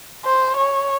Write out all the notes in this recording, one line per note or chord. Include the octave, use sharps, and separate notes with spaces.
C5
C#5